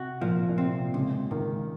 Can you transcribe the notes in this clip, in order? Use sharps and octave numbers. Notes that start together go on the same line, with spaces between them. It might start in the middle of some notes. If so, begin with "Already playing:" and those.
Already playing: C3 F#4
A#2 F3
A#2
C3 C4
C#2 C#3
C#2 D#3